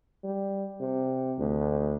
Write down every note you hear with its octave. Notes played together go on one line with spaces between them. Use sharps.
G3
C3
D2